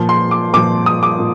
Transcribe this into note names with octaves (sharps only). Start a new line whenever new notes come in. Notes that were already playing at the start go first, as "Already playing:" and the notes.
Already playing: A#2 F3
C6
D6
A#2 F3 D6
D#6
D6
A#2